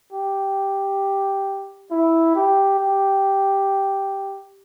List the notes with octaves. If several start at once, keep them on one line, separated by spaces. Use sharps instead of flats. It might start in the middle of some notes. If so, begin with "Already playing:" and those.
G4
E4
G4
G4